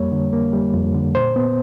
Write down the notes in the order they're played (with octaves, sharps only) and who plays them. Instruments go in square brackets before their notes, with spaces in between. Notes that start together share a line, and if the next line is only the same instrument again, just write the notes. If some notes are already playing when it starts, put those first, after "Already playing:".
Already playing: [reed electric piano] F2 G3 A#3 C#5
D3
A#3
G3
F2
D3
A#2 C5
B3